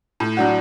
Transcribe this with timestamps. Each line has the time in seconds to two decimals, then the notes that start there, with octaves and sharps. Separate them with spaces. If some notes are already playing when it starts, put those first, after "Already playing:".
0.20 A2
0.37 F#3 D4 F#4